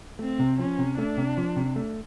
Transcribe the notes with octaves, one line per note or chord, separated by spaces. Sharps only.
A3 C4
C3
F3 C#4
C3
A3 D4
C3
F3
C3
A3